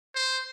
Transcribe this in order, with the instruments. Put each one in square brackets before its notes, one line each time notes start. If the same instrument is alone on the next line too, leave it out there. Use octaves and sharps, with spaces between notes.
[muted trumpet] C5